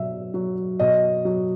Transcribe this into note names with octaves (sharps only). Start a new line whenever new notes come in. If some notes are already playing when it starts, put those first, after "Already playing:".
Already playing: B2 F#3 E5
F#3
B2 D#5
F#3